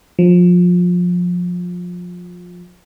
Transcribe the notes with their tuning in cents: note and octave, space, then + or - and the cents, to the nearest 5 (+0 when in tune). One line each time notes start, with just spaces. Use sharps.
F3 +25